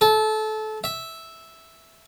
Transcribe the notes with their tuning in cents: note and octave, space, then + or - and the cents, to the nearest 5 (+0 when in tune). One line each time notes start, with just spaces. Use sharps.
A4 -25
E5 -5